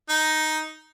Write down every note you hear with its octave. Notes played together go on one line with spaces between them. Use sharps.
D#4